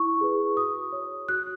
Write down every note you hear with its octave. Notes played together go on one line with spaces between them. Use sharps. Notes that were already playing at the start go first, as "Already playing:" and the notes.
Already playing: E4 C#6
G#4 B4
F#4 D#6
C#5
F#4 F#6